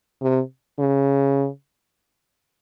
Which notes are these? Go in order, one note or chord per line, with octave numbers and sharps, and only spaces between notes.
C3
C#3